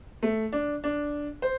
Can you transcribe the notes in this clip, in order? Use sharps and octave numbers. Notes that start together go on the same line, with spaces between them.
A3
D4
D4
C5